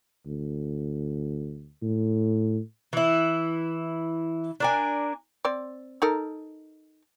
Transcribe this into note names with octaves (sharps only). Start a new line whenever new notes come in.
D2
A2
E3 E4
D4 A#4 G#5
C4 D5
D#4 A4 A#4